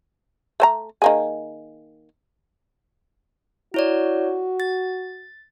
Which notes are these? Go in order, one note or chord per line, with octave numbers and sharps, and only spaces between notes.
A3 C5 A#5
D#3 A#3 G#4
E4 F#4 C#5 D5
A6